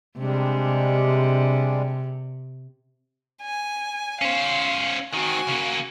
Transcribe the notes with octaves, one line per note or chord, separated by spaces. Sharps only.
C3 G3 G#3 D4
G#5
C#4 C5 F5
D#3 C4 F#4 G#5
C#3 A#3